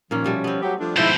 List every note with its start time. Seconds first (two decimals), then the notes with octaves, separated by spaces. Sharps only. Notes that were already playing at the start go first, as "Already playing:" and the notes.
0.11 A#2 D#3 F3 A#3 C#4
0.24 B2 G3 A3
0.44 B3 C4
0.62 F#3 G4
0.79 F3 A3 D4
0.97 G#2 B2 F3 E4 C5